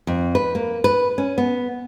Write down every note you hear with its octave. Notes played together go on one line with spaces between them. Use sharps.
F2
B4
A#3
B4
C#4
B3